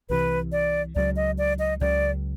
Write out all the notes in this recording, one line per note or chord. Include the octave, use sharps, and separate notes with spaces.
C2 C3 E3 B4
D5
C#2 C#3 F#3 D5
D#5
D5
D#5
C#2 C#3 F#3 D5